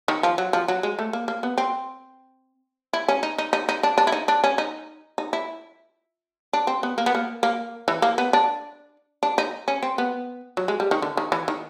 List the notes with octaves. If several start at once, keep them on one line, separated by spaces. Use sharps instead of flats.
D#3
F3
F#3
F3
F#3
G#3
A3
A#3
A#3
B3
C4
E4
C#4
D#4
D#4
D#4
D#4
D4
D4
E4
D#4
D4
C#4
D#4
D#4
E4
D4
C4
B3
A#3
B3
A#3
A#3
E3
A#3
B3
D4
D4
D#4
C#4
C4
B3
F#3
G#3
G3
D#3
D3
D#3
E3
D#3